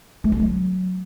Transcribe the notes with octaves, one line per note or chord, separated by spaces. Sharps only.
A3
D3
F#3